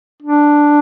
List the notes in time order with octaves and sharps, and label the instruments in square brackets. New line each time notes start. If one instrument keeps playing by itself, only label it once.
[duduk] D4